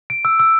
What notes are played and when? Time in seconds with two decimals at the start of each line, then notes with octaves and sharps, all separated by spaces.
0.10 D7
0.25 E6
0.40 E6